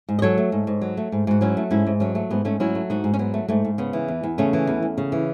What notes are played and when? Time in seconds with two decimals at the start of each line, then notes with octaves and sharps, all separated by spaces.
0.09 G#2
0.19 D#5
0.22 F#3 A4 C#5
0.38 A3
0.52 G#2
0.67 G#2
0.81 F#3
0.97 A3
1.12 G#2
1.27 G#2 F#4
1.41 F#3 C#4 E4
1.57 A3
1.71 G#2 C#4 E4
1.87 G#2
2.00 F#3 A3 C#4
2.15 A3
2.30 G#2 B3
2.45 G#2 A3 C#4
2.60 F#3 C#4 E4
2.75 A3
2.90 G#2 D#4 F#4
3.04 G#2
3.14 C#4
3.19 F#3 B3
3.34 A3
3.48 G#2 A3
3.65 G#2
3.78 C#3 B3
3.93 E3
4.08 E2
4.23 E2
4.38 C#3 A3 C#4
4.53 E3
4.67 E2
4.83 E2
4.98 C#3
5.12 E3